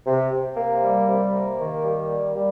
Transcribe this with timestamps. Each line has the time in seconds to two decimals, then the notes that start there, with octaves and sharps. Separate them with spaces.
0.07 C3
0.32 C3
0.57 A#3
0.82 G3
1.07 C3
1.33 A#3
1.59 D#3
1.84 G3
2.09 A#3
2.35 G3